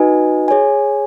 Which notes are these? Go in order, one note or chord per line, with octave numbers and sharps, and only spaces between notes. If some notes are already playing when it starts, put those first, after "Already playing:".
Already playing: D#4 F#4 B4 D#5 G#5
G#4 C#5 G#5